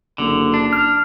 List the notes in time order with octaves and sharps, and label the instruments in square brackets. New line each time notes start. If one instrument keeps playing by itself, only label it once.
[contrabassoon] F#1 [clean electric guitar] D3
[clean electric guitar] D4
[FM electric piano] F6